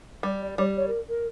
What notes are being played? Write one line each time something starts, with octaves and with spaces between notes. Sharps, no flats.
G3 D5
D5
G3 C#5
C#5
A#4
A#4